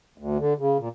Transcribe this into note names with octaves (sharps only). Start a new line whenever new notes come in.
D2
D3
C#3
A#2